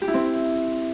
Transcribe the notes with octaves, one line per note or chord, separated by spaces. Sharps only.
G4
E4
C4